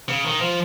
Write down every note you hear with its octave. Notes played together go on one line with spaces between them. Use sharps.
C#3
D#3
F3